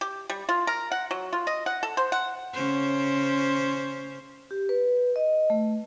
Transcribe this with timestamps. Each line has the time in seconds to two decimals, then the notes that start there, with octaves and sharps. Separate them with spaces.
0.01 G4
0.30 G3
0.49 F4
0.67 A#4
0.92 F#5
1.11 F#3
1.33 F4
1.47 D#5
1.66 F#5
1.83 A4
1.97 C5
2.12 F#5
2.53 C#3 C#4 C5
4.51 G4
4.69 B4
5.16 D#5
5.50 A3